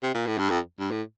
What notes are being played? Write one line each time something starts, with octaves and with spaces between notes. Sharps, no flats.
C3
A#2
A2
G2
F2
G2
A2